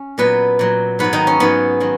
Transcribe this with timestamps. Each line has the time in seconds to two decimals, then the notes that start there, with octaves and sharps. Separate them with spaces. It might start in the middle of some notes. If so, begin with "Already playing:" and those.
Already playing: C#4
0.18 A#2 F#3 B3 B4
0.59 A#2 F#3
0.99 G#2 F#3 B3 B4
1.13 D#3 D#4
1.27 C#4
1.40 G#2 F#3 B3
1.80 D#3 F#3